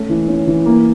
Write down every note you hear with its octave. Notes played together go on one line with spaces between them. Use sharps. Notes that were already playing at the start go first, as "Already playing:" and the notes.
Already playing: A3 C#4
E3
C#4
E3
A#3